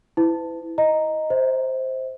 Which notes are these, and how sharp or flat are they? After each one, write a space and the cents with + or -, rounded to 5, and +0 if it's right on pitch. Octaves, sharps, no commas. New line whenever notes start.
E4 +0 B4 +35
D#5 +0 A#5 +0
C5 +0 E5 -45